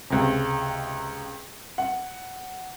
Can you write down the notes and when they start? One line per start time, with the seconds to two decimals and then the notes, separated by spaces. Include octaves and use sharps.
0.10 C#2 C3
1.78 F#5